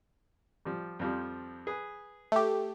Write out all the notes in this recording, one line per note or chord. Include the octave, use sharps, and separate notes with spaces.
F3 G3
F2 F3 G3
G#4 B4
A3 G4